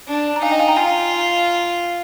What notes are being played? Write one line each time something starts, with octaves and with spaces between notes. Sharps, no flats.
D4
A#5
D#4 F5 G#5
D#5 G5
F5 G#5
G5 A#5
F4 F5 G#5